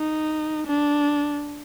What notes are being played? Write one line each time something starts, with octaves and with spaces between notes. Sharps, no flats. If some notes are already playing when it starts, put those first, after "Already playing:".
Already playing: D#4
D4